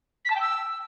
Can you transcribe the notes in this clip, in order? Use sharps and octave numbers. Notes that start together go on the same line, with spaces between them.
B6
A5
G5
E6